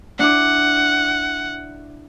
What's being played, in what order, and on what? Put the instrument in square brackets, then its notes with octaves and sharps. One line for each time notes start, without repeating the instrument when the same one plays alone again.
[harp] D4 E4 D6 [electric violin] F#5